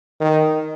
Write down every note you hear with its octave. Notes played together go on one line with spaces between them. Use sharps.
D#3